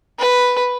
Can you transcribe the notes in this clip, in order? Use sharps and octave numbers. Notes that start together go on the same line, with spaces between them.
B4